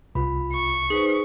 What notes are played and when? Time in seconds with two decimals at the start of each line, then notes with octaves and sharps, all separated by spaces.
0.15 C2 F4 B5
0.53 C#6
0.90 D#4 G#4 B4 C5